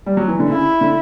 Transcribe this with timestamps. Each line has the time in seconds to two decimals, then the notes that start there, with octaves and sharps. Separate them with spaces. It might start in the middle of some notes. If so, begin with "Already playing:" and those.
0.06 G3
0.17 F#3
0.28 E3
0.39 D3
0.49 C#3 E4
0.81 D3